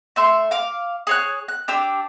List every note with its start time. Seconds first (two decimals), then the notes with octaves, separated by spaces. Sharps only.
0.16 A3 E5 C6
0.51 F5 D6
1.07 G#4 C#5 F#6
1.48 F#6
1.68 D4 G4 E6